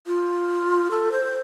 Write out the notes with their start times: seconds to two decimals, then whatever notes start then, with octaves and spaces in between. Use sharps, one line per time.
0.07 F4
0.91 A4
1.12 C5